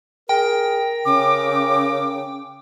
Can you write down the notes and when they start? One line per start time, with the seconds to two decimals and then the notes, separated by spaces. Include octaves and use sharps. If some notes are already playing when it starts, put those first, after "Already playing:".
0.29 G#4 A#4 G5
1.05 C#3 D6